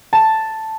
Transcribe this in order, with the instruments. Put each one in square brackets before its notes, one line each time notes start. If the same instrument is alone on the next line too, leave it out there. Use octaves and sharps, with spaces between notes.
[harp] A5